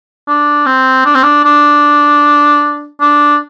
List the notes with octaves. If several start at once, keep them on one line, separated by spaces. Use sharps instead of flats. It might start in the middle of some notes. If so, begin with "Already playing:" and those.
D4
C4
D4
C4
D4
D4
D4